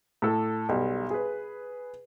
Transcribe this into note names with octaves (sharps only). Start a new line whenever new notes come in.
A2 A4
B1 G3
G#4 B4